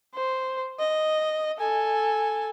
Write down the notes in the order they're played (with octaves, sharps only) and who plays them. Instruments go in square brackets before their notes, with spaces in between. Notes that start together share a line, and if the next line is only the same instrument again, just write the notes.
[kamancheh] C5
D#5
A4 G#5